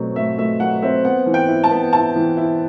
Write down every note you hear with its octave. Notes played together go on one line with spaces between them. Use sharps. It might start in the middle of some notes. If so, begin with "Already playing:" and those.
Already playing: B2 F#3 A3 C4
A3 E5
A3 E5
F#3 F#5
C4 E5
B3 F#5
E3
G5
E4
A5
B3
E4 A5
E3
E4